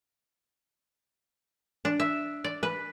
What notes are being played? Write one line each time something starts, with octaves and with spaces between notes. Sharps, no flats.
D4
E5
D5
B4